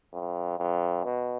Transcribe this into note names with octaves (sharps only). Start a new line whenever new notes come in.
F2
F2
B2